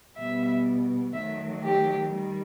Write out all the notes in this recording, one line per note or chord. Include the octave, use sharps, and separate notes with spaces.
B2 G3 B3 E5
D#3 F#3 A3 E5
G4
D#3 G3